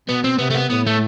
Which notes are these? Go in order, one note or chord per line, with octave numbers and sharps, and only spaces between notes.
B2 B3
C4
C3 B3
A3
B3
A2 B3
A3